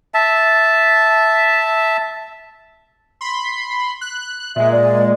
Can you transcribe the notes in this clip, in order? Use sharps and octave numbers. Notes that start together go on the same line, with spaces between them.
E5 A5
B5 C6
F#6
A#2 G#3 E5
D5